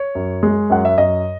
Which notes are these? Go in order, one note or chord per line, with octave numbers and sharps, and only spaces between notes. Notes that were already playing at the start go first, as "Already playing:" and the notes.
Already playing: C#5
F#2
G#3
F#2 F#5
E5
F#2 D#5